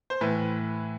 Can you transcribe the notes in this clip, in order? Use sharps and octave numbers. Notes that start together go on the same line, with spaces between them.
C5
A2 E3 B4